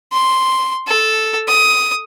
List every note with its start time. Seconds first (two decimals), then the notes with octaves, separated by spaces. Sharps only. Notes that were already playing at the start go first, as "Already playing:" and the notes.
0.13 C6
0.87 A4
1.48 D#6